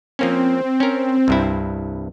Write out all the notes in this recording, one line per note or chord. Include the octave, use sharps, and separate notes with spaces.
F3 A#3 C4 C#4
C#4 A#4
C2 G2 E4